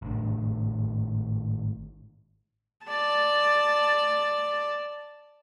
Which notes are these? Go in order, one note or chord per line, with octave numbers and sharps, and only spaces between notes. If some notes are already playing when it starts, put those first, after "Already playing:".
G#1 A2 D4
D5 A5